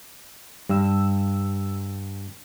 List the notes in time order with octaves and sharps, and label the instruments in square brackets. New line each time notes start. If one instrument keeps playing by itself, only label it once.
[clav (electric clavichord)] G2 [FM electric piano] G3 E6